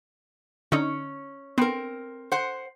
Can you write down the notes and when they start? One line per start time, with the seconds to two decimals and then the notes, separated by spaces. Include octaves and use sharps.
0.72 D3 C#4 D#4
1.58 B3 C4 A#4
2.32 C5 F#5